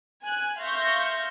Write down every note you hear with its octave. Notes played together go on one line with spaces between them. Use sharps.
G#5 F#6
E5 F5 C6 C#6 G6 A#6